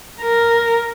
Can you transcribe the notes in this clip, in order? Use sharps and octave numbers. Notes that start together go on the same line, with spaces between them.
A#4